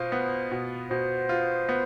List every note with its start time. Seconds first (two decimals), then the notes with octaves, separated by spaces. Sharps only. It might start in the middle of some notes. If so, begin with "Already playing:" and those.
Already playing: B2 F4 C5
0.12 B3
0.52 B2
0.90 B2 C5
1.29 F4
1.69 B3